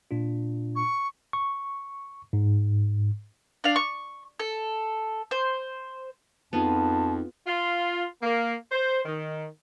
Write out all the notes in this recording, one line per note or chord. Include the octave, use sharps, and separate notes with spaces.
A#2 D4 F4
C#6
C#6
G#2
D4 F5
C#6
A4
C5
F2 B3 D#4 F4 G#4 A5
F4
A#3
C5
D#3